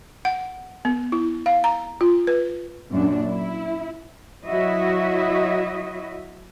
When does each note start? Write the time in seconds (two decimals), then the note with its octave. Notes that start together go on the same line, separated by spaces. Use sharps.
0.25 F#5
0.85 B3
1.12 E4
1.46 F5
1.64 A#5
2.01 F4
2.27 B4
2.91 F#2 A#2 D4
3.29 E4
4.48 F#3 E4 F#4 D#5 E5